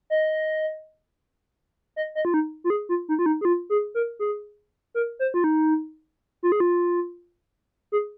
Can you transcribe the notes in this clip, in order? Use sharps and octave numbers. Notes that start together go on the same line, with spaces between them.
D#5
D#5
D#5
F4
D#4
F4
G#4
F4
D#4
F4
D#4
G#4
F4
G#4
A#4
G#4
A#4
C5
F4
D#4
F4
G#4
F4
G#4